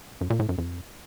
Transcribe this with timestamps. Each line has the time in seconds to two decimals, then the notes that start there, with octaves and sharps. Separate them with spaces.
0.21 F#2
0.30 A#2
0.39 A2
0.49 F#2
0.58 F2